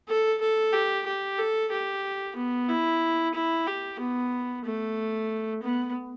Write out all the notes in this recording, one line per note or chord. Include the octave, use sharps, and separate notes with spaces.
A4
A4
G4
G4
A4
G4
B3
E4
E4
G4
B3
A3
B3